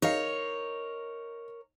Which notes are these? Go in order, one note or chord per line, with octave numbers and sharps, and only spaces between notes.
D#4 A#4 C#5 F5